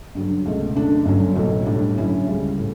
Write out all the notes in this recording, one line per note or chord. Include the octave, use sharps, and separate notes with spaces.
G2 D3 F#3
C#2 B2 A3
F#2 D3 A3 D4
G1 G2 D3 F#3 C#4
B1 A2 F#3 A3
A2 G3 D4
G2 D3 F#3 C#4 E4
C#2 C#3 G3
A2